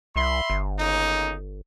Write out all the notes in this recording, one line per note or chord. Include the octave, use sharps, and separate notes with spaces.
C2 E5 B5 C6
G1
C#3 A#3 D#4